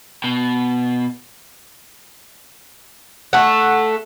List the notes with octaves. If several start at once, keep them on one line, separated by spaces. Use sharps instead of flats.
B2
A3 F#5